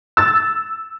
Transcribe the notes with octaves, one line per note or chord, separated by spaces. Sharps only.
E6 A6